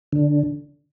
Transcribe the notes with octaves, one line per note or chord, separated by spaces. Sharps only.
D3